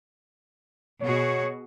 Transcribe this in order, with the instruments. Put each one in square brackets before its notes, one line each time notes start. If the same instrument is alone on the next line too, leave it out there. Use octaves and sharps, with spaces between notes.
[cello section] B2 F#4 G#4 [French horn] C#5